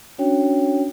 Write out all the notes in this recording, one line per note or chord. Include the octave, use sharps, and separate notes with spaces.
C#4 D4 F#4 C#5 G5